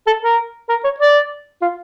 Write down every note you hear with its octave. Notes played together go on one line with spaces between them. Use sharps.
A4
A#4
A#4
C#5
D5
F4